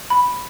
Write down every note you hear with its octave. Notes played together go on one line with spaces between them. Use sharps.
B5